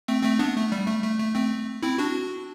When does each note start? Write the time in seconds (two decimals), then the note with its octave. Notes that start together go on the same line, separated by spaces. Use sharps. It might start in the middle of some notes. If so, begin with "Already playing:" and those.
0.08 A3 C4
0.23 A3 C4
0.39 B3 D4
0.56 A3
0.72 G3
0.88 A3
1.03 A3
1.20 A3
1.35 A3 C4
1.83 C4 E4
1.98 D4 F#4